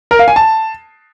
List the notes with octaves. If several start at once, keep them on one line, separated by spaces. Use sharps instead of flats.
A#4
F5
G#5
A5